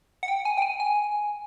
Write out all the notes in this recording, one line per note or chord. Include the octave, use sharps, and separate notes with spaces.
F#5
G5
G#5
G5
G#5
G#5